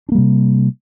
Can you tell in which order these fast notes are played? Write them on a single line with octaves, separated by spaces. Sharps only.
D4 A#3 G3 C3